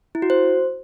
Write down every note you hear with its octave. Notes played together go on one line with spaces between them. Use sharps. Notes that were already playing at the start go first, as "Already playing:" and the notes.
E4
F#4
C5